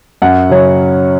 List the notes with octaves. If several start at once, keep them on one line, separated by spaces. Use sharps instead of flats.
F#2 F#5
C#3 F#3 C#4